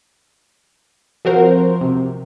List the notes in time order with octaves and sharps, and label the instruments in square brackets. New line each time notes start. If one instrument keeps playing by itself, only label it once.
[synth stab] F3 C4 F#4 A#4 C5
C3